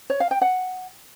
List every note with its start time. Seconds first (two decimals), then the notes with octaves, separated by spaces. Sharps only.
0.10 C#5
0.20 F5
0.31 G5
0.41 F#5